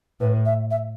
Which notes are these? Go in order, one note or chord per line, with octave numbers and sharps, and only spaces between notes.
A2 B4
E5
E5